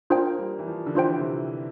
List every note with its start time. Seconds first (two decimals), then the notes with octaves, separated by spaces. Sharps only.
0.10 A#3 D4 F4 C5 G5
0.38 G3
0.59 E3
0.67 F3
0.86 D3
0.95 E3 D4 F4 C5 G5
1.17 C3